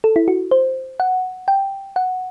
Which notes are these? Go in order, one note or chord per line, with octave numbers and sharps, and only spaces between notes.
A4
E4
F#4
C5
F#5
G5
F#5